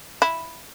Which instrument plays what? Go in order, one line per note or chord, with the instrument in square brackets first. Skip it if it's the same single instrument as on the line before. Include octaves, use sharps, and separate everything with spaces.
[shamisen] E4